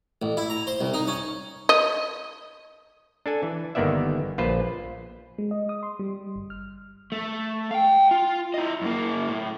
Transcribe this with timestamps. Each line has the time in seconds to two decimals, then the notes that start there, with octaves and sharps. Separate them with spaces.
0.22 A1
0.37 E4
0.50 A#5
0.67 C5
0.81 C2
0.94 D#4
1.07 C#4
1.69 D#5
3.26 D4 A4 G#5
3.43 E3
3.75 G1 D#3 A#3 B3 D5 E5
4.38 A#1 F4 B4 C5
5.38 G#3
5.51 D#5
5.69 D#6
5.83 C6
5.99 G3
6.36 G1
6.50 F6
7.12 A3
7.71 F5 G5
8.11 F4
8.54 E4 D#5
8.82 F#2 A#3
9.29 A2